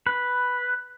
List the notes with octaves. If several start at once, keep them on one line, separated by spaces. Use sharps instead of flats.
B4